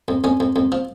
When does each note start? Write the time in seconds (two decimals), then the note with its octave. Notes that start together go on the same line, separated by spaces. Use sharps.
0.08 F2
0.24 F2 C#4
0.40 F2
0.56 F2
0.72 F3